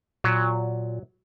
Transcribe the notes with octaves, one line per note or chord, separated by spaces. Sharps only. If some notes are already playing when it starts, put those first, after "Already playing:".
A#2 F#3